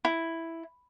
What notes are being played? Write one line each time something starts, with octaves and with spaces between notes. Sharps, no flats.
E4